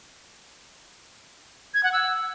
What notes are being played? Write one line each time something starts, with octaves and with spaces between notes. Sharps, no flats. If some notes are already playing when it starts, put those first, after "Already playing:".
G#6
F#5
E6